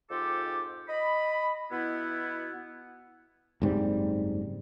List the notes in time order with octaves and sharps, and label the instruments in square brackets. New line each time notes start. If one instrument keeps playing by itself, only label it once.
[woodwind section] F2 G#2 F4 G4 A4 D6
D#5 B5
B2 B3 E4
[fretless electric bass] F#1 G#2 G3 C4